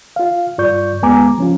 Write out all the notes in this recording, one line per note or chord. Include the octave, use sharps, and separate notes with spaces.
F4 F5
G2 F4 D5 C#6 G6
D#2 G#3 B3 G#5 A#5 D6
F3 C#4 F4